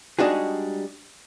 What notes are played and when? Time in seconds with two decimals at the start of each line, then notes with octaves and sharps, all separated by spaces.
0.19 G3 G#3 D4 D#4 F#4 G#4